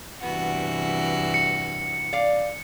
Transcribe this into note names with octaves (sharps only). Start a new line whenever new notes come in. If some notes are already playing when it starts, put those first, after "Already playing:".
G2 C3 E3 B3 F#4
C#7
D5 F5